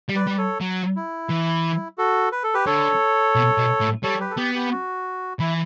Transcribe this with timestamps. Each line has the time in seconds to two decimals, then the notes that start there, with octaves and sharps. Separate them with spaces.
0.09 G3
0.16 B4 D5
0.27 G3
0.31 D5
0.38 A4 C#5
0.61 F#3
0.96 E4
1.30 E3
1.98 F#4 A4
2.32 B4
2.43 A4
2.54 G4 B4
2.66 D3 A4 C#5
3.35 B2
3.58 B2
3.80 A2
4.03 G3 A4 C#5
4.20 G4 B4
4.30 A4
4.37 B3 G4
4.55 G4
4.72 F#4
5.40 E3 E4